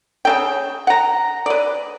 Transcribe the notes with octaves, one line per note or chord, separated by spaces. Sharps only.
C#3 D4 G5
F#5 A#5
B4 D5